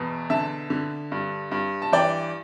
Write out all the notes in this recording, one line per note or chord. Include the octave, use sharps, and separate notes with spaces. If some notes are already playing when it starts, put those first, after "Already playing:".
Already playing: E2 B2
D3 E5 A5
D3
G2
G2
A5
E3 D5 G5